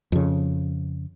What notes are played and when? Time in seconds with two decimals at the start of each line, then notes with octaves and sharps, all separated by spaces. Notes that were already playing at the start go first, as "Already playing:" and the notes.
0.12 F2 C#3